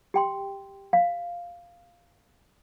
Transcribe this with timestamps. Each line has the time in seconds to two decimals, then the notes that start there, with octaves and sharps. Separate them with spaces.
0.14 G4 G5 C6
0.93 F5